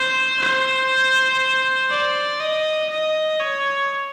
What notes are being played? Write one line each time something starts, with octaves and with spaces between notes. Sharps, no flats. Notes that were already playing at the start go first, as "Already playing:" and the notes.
Already playing: C5
C5
D5
D#5
D#5
C#5